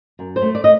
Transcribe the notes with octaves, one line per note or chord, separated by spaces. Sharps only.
F#2
C5
A3
D5
D#5